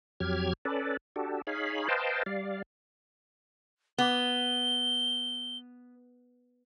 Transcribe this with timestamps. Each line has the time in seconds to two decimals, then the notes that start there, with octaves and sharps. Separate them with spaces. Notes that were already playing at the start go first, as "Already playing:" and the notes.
0.20 F2 F#3 G4 F6 G#6
0.65 C#4 A4 B4 D5
1.16 D4 F#4 G4 A4
1.47 D#4 G#4 C#5 F5 B5
1.89 B4 C5 D#5 F5 G5 A5
2.26 G3 D5 F5
3.98 B3 G7